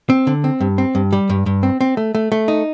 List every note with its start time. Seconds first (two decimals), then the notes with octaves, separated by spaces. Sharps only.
0.10 C4
0.27 D3
0.44 C4
0.61 G2
0.78 C4
0.95 G2
1.13 G3
1.30 G2
1.46 G2
1.63 C4
1.81 C4
1.97 A3
2.15 A3
2.32 A3
2.48 D#4